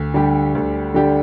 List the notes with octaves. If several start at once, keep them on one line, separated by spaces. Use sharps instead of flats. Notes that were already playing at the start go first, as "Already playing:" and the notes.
Already playing: D2
D3 G3 D4 G4
D2
D3 G3 D4 G4